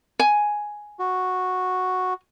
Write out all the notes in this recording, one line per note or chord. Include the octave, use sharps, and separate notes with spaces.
G#5
F#4